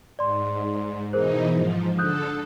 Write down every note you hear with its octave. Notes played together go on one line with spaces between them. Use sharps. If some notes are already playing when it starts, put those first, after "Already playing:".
G#2 D5 C6
B2 E3 D#4 G#4 A#4 C5
G#2 F3
D3 A4 D#6 F#6 G6